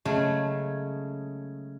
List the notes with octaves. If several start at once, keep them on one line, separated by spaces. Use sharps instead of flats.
C#3 F#3 G#3 A3 G#4